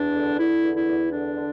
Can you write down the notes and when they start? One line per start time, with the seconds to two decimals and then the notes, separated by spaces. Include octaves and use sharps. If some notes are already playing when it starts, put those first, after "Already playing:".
Already playing: E2 D4
0.14 D3
0.38 D3 E4
0.63 E2
0.75 E4
0.88 E2
1.12 D3 D4
1.36 D3